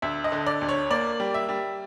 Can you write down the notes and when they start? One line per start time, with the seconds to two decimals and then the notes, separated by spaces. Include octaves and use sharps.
0.02 D2 E5
0.24 D#5
0.32 D3
0.46 D5
0.62 D2
0.69 C#5
0.91 A#3 D5
1.20 G3
1.34 E5
1.49 G3